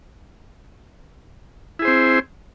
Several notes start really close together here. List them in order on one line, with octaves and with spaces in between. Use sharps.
E4 G#4 C5 C4